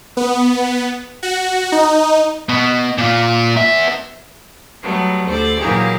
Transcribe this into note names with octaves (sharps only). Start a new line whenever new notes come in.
B3
F#4
D#4
B2 B3
A#2 F4
B3 E5
F#3 G3 A3 B3
D2 A4 C5 D5
A#2 E3 F#3 A#3 G4 G#4